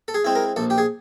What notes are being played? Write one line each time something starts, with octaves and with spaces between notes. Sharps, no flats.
A4
G#4
G#3 C4 E4
A#4
A#1 A4
G4
G#4